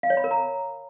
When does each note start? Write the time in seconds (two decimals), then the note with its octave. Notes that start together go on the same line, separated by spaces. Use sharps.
0.03 F5
0.10 C#5
0.17 B5
0.24 A#4
0.31 A#5